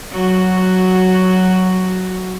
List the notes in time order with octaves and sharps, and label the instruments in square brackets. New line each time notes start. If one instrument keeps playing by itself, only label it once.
[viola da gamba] F#3 F#4